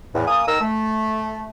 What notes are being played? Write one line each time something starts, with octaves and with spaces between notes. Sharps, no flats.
E2 A2
A#3 G#5 D#6
D#3 A#4 A#5 E6
A3